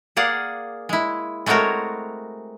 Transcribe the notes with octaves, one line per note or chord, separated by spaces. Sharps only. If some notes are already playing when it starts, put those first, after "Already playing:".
A#3 G#4 D5 F5 F#5
G#3 E4
G#3 A3 C4 F#4 A#4 C#5